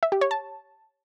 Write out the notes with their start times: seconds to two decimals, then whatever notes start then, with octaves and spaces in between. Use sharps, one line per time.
0.03 E5
0.12 G4
0.21 C#5
0.31 A5